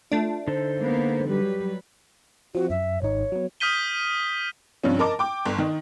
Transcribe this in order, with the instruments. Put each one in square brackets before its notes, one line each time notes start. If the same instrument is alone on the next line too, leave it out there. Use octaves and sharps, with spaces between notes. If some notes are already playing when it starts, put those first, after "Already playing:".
[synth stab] A3 D4 [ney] F4
[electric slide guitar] D3 D#4 A4 [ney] C5
[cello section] A#3 B3
[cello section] F#3 G3 B4 [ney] G4
[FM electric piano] F3 C4 [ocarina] F#4
[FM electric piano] F#2 [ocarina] E5
[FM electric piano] G#1 D#4 [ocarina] C#5
[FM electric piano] F#3 B3
[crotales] D#6 F6 G6 B6 D#7 G7
[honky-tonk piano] G2 C3 F3 C#4
A#4 D#5 A5 D6
G5 D6
G1
D#3 D#4